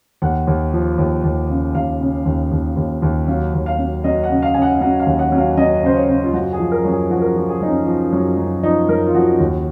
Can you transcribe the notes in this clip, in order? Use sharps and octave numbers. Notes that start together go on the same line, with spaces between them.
D#2 F#5
D#2
F3
D#2
D#2
C#3
D#2 F5
C#3
D#2
D#2
D#2
D#2
F#3 F5
D#2
F5
F#3
F#3 D#5
F#5
C#3
F5
C#3 G#5
F#5
F#3 F#5
F5
D#2
F#5
F#3
F5
F#3 D#5
C#3 C5
C#5
C#3
F4
F#2 F#4
G#4
F3
A#4
F#2
G#4
F3 F#4
A#4
G#4
F3
G#4
F#2 D#4
C#4
F3
F#2
F#2
F3 D#4
F#2 A#4
F4
F3 F#4
D#2